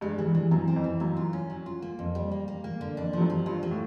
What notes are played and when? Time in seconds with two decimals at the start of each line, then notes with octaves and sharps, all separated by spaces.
0.01 G2 G#3
0.18 E3
0.26 G2
0.35 E3
0.51 F#2 E3
0.68 C4
0.76 F2
0.84 E3
1.00 F#2 A#3
1.17 F4
1.33 C#4
1.50 F#3
1.66 F4
1.82 A#3
1.99 F2
2.15 G3
2.32 A#3
2.48 A#3
2.64 A#3
2.81 D3
2.97 F2 D4
3.13 G2 F3
3.21 F#2
3.30 F3
3.46 G2 F4
3.63 A#3
3.71 A2